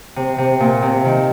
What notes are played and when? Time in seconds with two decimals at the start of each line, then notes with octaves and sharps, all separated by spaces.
0.16 C3
0.38 C3
0.60 A#2
0.82 C3
1.05 D#3